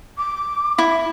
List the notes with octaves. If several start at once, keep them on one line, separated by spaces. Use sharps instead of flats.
D6
E4